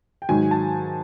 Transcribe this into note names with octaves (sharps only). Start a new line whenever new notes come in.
G5
G#2 D#3 F#3 G#5
A5